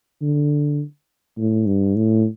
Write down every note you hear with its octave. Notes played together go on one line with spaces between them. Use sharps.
D3
A2
G2
A2